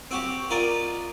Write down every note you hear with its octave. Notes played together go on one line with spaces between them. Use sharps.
C4 F#4 G4
F4 A#4 D5 D#5